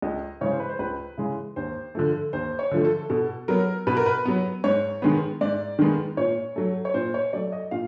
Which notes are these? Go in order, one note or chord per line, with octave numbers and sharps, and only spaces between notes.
C#2 D#5
C#3 E3 G#3 C#5
C5
B4
C5
C#2 B4
C#3 E3 G#3
D#2 C5
D3 F3 A3
D#2 C5
C#5
D3 F3 A3
A4
B2 A4
F#3 B3 A#4
B2 B4
A#4
B4
F#3 B3
G#2 C#5
D#3 G#3 B3
G#2 D5
D#3 G#3 B3
A#2 C#5
F#3 A3
C#5
A#2 C5
C#5
F#3 A3 D5
D#5
A#2 F5